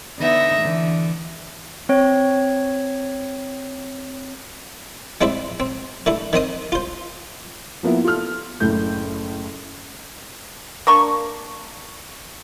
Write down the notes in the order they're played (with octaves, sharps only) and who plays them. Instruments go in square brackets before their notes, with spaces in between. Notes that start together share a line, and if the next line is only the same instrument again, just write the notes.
[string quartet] D3 B3 D#4 E5 A#6
D3 E3
[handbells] C4 C#5
[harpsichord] G#3 C4 E4 D5 E5
C4
D3 A3 E4
D#3 C4 D#5 D#6
F4 C5
[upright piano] F3 A#3 B3 E4
F4 A4 F6
F#1 A2 A3 G6
[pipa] A#3 D4 C#6